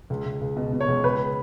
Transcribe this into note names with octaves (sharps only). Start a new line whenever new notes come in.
C#2
C#2
C#2
B2
B2
C#5
C#2
C#2 B4